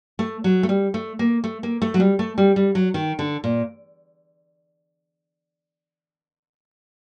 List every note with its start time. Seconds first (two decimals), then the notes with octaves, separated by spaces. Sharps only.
0.19 A3
0.44 F#3
0.63 A3
0.69 G3
0.94 A3
1.19 A#3
1.44 A3
1.63 A#3
1.82 A3
1.94 F#3
2.00 G3
2.19 A3
2.38 G3
2.56 G3
2.75 F#3
2.94 D#3
3.19 D3
3.44 A#2